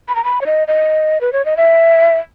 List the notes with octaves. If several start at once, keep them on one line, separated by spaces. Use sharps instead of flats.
B5
A#5
B5
C#5
D#5
D#5
B4
C#5
D#5
E5